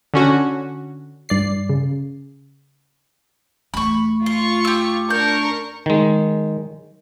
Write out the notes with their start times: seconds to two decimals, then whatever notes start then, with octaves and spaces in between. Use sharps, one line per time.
0.14 D3 C#4 F#4
1.29 G2 D5 C7
1.70 C#3
3.74 E2 A3 B5 C#6
4.26 F4 C6 C#6
4.65 G4 E6
5.10 D4 A#4 C#6 G6
5.86 D#3 G#3